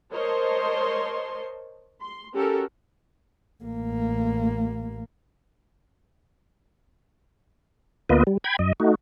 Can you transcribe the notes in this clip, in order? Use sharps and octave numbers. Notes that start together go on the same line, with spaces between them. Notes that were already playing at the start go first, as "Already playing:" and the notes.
A#4 C5 C#5 D#5 A5 C6
C6
C#4 F#4 G4 A4 A#4
A1 A#3
D2 A#3 B3 F4 B4 D#5
G3
G5 B5 G#6
F#2 D#5
A3 D#4 F#4